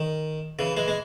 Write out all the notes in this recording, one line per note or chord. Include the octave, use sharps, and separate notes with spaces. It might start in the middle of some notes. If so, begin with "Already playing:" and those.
Already playing: D#3
C#3 E3
E3 G#3
G#3